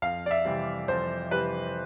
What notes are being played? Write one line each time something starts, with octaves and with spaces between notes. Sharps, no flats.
F2 F5
D5
E5
C3 E3 G3
F2 C5
C3 E3 G3 B4